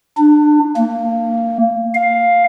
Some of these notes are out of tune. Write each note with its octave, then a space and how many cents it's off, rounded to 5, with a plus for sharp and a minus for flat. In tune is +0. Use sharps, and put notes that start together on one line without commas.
D4 +25
A#3 -20
F5 +5